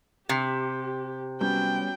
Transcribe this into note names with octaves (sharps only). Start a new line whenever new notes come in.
C3 G4
F#3 G3 B3 C#4 G5